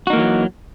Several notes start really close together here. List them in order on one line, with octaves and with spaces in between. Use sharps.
F#4 D#4 A#3 E3 F#3